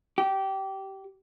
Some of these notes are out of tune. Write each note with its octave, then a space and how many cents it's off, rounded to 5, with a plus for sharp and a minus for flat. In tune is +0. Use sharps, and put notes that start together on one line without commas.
G4 -20